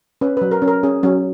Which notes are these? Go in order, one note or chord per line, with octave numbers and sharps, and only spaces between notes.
C#4 B4
B4
F#3
A#4
C#4
A#4
C#4 G#4
F#3 C#4